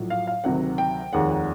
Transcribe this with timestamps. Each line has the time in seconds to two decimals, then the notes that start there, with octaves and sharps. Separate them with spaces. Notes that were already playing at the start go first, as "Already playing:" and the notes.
Already playing: A#1 A2 F#3
0.10 F5
0.27 F5
0.44 D2 C3 D#3 F#3 F#5
0.78 G5
1.13 F1 D#2 D#3 G#3 F#5
1.30 F#5